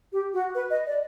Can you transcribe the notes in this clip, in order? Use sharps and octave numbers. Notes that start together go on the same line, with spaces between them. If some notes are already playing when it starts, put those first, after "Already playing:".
G4
F#4
B4
D#5
D5